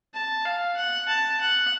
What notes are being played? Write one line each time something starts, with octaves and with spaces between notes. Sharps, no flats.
A5
F5
F#5
A5
F#5